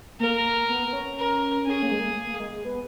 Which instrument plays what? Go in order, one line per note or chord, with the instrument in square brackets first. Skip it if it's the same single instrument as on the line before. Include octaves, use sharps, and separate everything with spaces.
[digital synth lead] A#3 [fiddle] A#4
[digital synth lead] B3
B3
C#4
[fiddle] A#4
[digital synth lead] C#4 [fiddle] G#4
[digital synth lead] A#3
G#3
A#3
A#3
A#3
G#3
G#3
B3